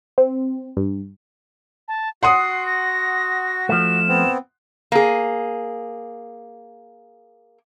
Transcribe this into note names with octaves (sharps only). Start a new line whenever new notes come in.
C4
G2
A5
F#4 F#5 C6 D#6 C7
A#6
F3 A3 E7
B3 C4
A#3 G#4